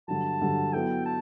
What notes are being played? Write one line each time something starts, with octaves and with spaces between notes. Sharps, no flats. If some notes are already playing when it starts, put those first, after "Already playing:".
G2 D3 F#3 A5
G2 D3 F#3
F#3 B3 E4 A4 G5
A5